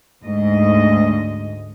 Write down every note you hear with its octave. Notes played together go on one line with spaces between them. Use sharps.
D2 G#2 D#5